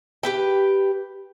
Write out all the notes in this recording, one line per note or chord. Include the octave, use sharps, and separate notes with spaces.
G4 B4 G5